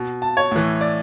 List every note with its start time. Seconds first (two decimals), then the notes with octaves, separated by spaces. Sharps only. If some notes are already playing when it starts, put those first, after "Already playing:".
Already playing: B2
0.22 A5
0.37 C#5
0.52 A2 E3
0.81 D5